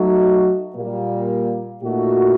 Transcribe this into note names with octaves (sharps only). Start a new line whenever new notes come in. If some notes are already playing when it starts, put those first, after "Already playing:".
Already playing: F#3 A3 D#4 F#4
A#2 G3 A#3
A#2 A3 D#4 F#4